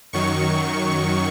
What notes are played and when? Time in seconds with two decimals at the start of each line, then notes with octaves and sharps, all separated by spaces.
0.13 F#2 D#3 F#3 C#6